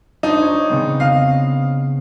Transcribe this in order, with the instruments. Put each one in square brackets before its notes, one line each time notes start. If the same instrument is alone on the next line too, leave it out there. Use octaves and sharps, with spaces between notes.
[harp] D4 C5 [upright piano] D#4
[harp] C#5
C#3 B3 C4
[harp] D#5 [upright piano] F5